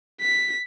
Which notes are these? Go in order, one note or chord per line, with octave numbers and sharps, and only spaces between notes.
B6